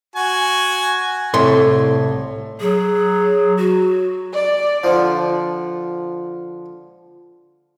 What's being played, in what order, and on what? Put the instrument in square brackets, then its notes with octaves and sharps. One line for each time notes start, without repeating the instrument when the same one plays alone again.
[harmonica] F#4 G#5
[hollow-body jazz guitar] C2 A2 C6
[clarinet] F#3 [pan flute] G#4
[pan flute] F#4
[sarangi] D5
[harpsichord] D3 F3